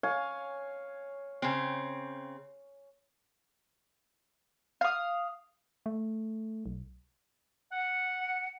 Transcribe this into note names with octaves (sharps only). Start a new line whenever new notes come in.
C#5 F5 G#5
C#3 C4
F5 D#6
A3
B1
F#5